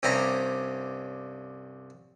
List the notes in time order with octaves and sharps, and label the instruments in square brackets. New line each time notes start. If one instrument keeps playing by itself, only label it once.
[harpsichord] C2 G2 C4 C#4 A#5 B5